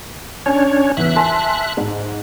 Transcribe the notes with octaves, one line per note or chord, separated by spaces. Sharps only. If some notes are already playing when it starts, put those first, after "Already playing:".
C#4 D4 C#5 G#5
E2 E3 E5 F#6
G#5 A5 C6
G#2